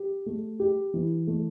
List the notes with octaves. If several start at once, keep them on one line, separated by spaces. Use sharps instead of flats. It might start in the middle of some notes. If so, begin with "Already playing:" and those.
Already playing: G4
A3
G4
E3
A3